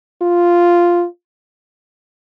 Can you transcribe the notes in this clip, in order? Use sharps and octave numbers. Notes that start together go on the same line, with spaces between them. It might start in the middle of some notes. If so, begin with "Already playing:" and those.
F4